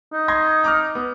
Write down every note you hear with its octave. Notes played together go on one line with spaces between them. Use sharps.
D#4
C6 G#6 A#6
A#5 D6 F6
B3